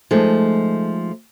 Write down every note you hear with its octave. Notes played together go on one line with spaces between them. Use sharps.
F3 G#3 A3 D#4